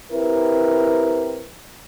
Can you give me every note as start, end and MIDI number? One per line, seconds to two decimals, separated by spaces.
0.12 1.45 60
0.12 1.45 64
0.12 1.45 67
0.12 1.45 70
0.12 1.45 71